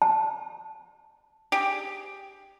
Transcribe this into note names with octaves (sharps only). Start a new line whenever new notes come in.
A5
G4 G#4